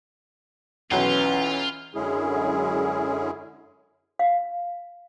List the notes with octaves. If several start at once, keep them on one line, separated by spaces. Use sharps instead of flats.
B1 E3 F#3 C#4 F4
F#2 D3 G#3 C#4 E4 G#4
F5